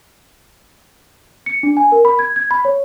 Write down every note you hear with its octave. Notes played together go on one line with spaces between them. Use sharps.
C#7
D4
G#5
A#4
B5
G#6
G#6
B5
C#5